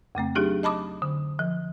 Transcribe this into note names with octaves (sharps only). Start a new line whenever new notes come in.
F2 C#3 A3 C4
F#3 D4 D#4 G4 G#4
D#5 A5 B5 D6 D#6
D3
F3